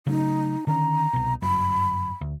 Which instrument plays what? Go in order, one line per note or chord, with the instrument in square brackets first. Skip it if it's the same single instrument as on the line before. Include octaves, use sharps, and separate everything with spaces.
[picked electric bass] C#3 F#3 A3 [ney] D#4
[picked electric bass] D3 D#3 C#4 [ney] A#5
[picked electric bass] C2 B2
[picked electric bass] G1 F#2 [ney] B5
[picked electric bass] D2